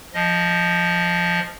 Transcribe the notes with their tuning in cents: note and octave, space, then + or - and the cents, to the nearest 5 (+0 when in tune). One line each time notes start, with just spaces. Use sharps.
F3 +0 D#5 +0